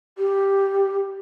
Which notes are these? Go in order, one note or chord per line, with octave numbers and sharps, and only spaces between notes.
G4